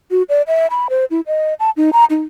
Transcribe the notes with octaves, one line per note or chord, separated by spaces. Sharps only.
F#4
D5
E5
B5
C5
E4
D#5
A5
D#4
A#5
D#4